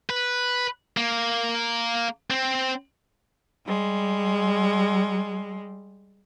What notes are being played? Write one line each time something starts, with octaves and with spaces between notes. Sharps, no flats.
B4
A#3
C4
G3 G#3